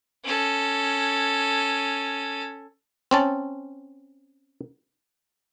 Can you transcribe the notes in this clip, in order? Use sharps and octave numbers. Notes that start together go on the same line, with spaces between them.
C#4 A4
C4 C#4 A5